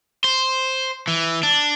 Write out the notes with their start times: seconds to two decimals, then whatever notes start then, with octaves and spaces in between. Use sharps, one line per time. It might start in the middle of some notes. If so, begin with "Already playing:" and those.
0.24 C5
1.07 E3
1.43 D4